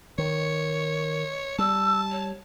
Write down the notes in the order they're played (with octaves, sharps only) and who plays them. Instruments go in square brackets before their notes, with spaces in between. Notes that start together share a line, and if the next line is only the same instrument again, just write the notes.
[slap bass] D#3 [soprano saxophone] C#5
[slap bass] G3 [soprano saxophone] A5 [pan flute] E6
[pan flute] C#5